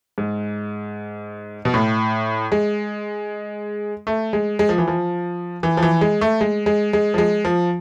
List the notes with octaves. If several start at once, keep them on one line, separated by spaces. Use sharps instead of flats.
G#2
B2
A2
G#3
A3
G#3
G#3
F3
E3
F3
E3
F3
E3
G#3
A3
G#3
G#3
G#3
F3
G#3
F3